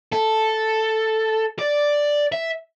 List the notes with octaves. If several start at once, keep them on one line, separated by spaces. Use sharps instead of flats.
A4
D5
E5